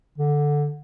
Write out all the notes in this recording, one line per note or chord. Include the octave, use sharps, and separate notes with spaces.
D3